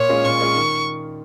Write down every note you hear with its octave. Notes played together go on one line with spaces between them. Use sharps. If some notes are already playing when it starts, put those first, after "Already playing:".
Already playing: A#2 C#5
G#3 C#4 F4
A#2 C#6
G#3 C#4 F4
D#3